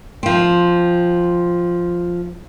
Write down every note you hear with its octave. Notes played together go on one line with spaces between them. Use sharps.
F3 C4